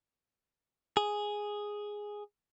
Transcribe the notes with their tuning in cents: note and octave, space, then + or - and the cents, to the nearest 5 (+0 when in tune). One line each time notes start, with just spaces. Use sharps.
G#4 +0